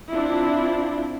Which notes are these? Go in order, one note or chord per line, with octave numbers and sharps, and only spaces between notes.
C4 D4 E4 F4